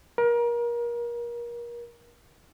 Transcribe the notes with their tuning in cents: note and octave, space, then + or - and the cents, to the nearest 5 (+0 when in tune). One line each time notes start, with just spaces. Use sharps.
A#4 +30